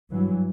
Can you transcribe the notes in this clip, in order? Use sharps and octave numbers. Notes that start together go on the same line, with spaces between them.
G2 E3 F#3